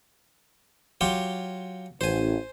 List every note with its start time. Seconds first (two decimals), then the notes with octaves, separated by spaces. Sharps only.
1.01 F#3 F4 G4
2.01 A1 C5 G#5